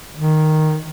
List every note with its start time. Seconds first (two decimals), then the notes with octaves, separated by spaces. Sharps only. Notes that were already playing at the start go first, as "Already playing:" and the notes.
0.14 D#3